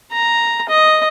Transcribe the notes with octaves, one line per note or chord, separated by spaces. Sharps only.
A#5
D#5